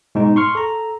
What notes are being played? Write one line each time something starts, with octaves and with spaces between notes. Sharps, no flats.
G#2 B2 D#4
C6 C#6 F6
A4 A#5